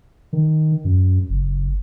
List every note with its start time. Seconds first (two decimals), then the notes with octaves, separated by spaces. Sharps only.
0.33 D#3
0.85 F#2
1.29 F#1